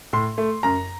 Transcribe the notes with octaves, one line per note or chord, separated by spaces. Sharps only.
A2 C6
A3
F#2 A#5